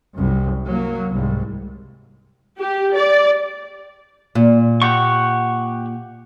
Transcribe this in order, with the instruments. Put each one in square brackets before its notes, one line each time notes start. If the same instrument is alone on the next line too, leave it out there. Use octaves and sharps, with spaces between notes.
[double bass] C2 F#2
F#3 A#3
C2 G#2
[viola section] G4
D5
[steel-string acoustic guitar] A#2
[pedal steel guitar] G4 F#5 C#6